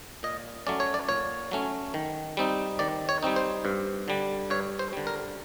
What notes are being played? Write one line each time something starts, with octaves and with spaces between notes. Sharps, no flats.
A#2 D#5
F#3 A3 C#4 D5
C#5
D5
A#2 C#5
F#3 A3 C#4
D#3
G3 C4 D#4
D#3 D5
C#5
G3 C4 D#4
C5
G2
D3 G3
G2 C#5
C5
D3 G3
A#4